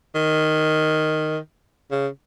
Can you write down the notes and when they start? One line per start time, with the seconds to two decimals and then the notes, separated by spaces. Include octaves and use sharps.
0.15 D#3
1.91 C#3